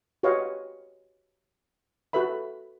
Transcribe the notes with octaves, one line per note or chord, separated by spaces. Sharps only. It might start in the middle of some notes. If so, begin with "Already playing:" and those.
F#4 G4 B4 C#5 D#5 F5
F#4 A4 B4 E5 B5